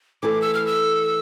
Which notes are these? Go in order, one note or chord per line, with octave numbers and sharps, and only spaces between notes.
E3 A3 E4 A4 D6
E6
F6
E6